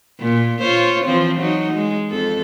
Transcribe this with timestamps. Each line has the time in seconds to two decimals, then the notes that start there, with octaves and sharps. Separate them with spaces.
0.20 A#2
0.60 F4 C5 C#5
1.05 E3 F3 C4
1.39 F#3 D#4
1.73 G#3
2.10 F2 A4